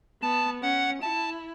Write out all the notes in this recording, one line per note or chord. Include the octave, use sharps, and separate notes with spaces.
B3 A5
C#4 F#5
E4 A5